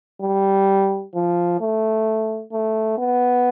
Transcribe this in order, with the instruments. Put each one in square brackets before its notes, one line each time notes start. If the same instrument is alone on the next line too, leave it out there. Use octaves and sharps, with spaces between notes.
[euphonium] G3
F3
A3
A3
B3